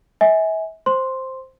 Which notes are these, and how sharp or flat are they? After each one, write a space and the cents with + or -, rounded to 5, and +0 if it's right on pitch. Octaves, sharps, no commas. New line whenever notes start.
E5 -35 G#5 +0
C5 +0 C6 +0